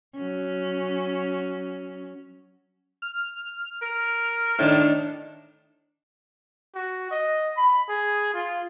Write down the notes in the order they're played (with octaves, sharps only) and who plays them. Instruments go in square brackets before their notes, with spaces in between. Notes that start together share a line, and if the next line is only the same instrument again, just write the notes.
[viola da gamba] F#3 C#4
[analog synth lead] F6
[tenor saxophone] A#4
[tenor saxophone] A2 [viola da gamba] D#3 D4
[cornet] F#4
D#5
B5
G#4
F4